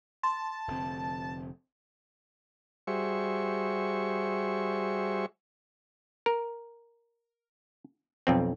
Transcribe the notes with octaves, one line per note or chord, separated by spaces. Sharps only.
A5 C6
F1 D3 C4
G3 F#4 G#4 C5 E5 C#6
A#4
B1 F2 C4